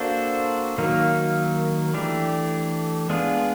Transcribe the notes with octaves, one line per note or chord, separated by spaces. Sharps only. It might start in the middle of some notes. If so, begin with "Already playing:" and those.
Already playing: A#3 D4 F#4 A4 C5
D#3 F#3 A#3 D#4
E3 A3 D4 G4
G#3 B3 D4 F4 G#4